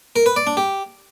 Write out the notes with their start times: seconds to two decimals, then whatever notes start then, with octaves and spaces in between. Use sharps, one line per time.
0.16 A#4
0.26 B4
0.36 D5
0.47 D4
0.57 G4